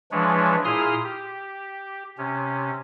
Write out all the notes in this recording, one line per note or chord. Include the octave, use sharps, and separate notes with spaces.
E3 F3 G#3 D4 B4 C#5
A#2 E4 G#4 C6 D#6 F6
G4
C3 C#4